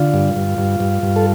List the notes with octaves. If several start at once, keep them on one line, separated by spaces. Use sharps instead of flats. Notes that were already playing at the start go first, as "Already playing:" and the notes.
Already playing: D3 F4
G2
G2
G2
G2
G2
A4